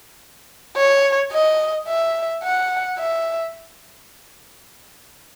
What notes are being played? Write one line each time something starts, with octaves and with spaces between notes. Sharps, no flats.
C#5
D#5
E5
F#5
E5